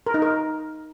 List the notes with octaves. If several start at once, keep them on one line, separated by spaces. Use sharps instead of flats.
A#4
D#4
A#4